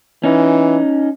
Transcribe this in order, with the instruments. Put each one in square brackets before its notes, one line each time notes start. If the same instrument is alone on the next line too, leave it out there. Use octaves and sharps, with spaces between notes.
[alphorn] E3 [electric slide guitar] C#4 D#4